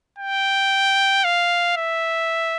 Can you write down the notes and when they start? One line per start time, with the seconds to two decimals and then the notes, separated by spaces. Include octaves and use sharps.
0.19 G5
1.24 F5
1.77 E5